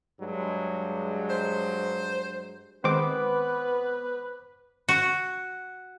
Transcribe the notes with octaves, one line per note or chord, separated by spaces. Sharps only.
G2 F#3 G#3
C5
D#3 G#3 B3 C4 B4 C5 D6
F#4